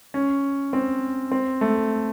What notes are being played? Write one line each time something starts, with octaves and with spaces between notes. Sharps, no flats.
C#4
C4
C4
A3